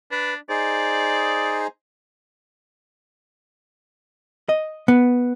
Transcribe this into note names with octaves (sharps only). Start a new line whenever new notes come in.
D4 B4
D#4 G#4 C5 D5
D#5
B3